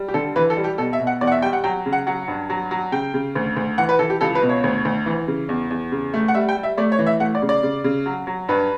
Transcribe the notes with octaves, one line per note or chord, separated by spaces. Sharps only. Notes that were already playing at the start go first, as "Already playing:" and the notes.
Already playing: G3
G4
D3 A4
E3 B4
A4
G3
G4
B2 A4
E5
B2
F#5
E2 D5
F#5
E5
G3 G5
F#5
F#3 G5
C#3
F#5
F#3 F#5
G2
F#3
F#3
C#3 G5
C#3
D2
D2
E3 F#5
B4
E3 A4
G4
C#2 A4
B4
B2
C#5
D2
D2
E3
C#3
E2
E2
C#3
A3
F#5
G3 E5
G5
G3
E5
A3 D5
C#5
E3
E5
A3 F#5
D5
C#3
D5
C#3
C#3
F#3
F#3
G2 B4